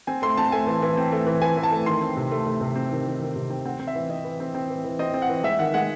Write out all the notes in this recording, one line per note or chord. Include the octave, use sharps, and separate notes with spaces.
C4 G#5
A3 C6
C4 A5
A3 G#5
E3
E3
C4
A3
E3
E3 G#5
E3
A5
A3
D#3 C6
C4
C3
A3
A3
C3
C4
D#3
D#3
D#3
C3
C4
C4 F#5
C4
E5
E3
C4 D#5
E3
C4
C4
E3
E3
C4 D#5
C4
F#5
E3
G#3 E5
D#3 F#5
G#3 F#5